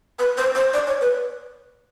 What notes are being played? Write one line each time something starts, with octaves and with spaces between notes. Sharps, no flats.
B4
C5
C5
D5
C#5
B4